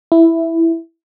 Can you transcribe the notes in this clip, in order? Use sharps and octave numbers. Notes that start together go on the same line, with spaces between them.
E4